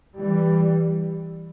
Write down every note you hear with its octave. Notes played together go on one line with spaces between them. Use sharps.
E3 G3